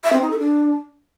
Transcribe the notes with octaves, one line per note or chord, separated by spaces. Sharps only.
E5
C4
D#4
A4
D4